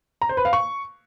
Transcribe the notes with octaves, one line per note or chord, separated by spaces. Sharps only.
A#5
C5
B4
F5
C#6